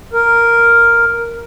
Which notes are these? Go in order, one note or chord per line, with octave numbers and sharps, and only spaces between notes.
A#4